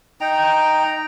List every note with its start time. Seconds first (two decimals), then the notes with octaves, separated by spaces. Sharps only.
0.21 D#4 G5 A#5